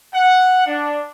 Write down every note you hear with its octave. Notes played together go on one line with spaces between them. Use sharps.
F#5
D4